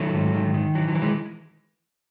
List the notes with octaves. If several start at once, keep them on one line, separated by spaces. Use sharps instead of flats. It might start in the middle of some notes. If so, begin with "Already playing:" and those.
Already playing: D#3 F#3 A3
G#2
D#3
D#3
E3 F#3
F#3
E3
G#3